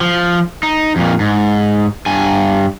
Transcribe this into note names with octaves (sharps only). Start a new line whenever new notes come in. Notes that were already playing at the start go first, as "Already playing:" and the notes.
F3
D#4
F2 A#2
G#2
G2 G#5